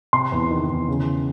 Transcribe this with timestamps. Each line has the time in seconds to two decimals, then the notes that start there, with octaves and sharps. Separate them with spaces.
0.13 C3 C6
0.32 E2
0.51 D#3
0.69 E2
0.88 C#3